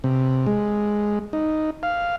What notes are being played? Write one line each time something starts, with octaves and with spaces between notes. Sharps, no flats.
C3
G#3
D#4
F5